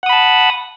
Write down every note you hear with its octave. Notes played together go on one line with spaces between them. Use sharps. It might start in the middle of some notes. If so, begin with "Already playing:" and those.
F#5 A5 B5 D#6